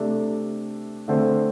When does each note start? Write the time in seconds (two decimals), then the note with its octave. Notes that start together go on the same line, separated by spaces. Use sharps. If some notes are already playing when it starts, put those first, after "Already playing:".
Already playing: C3 A3 D4 A4
1.08 D3 A3 C4 A4 C5